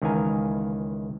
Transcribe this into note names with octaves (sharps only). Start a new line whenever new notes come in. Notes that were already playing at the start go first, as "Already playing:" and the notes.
C#2 D#3 E3 F5 G#5 A#5